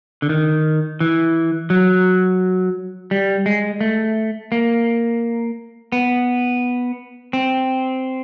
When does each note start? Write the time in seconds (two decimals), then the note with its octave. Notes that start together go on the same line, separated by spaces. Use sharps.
0.22 D3
0.29 D#3
1.00 E3
1.70 F#3
3.11 G3
3.46 G#3
3.81 A3
4.52 A#3
5.92 B3
7.33 C4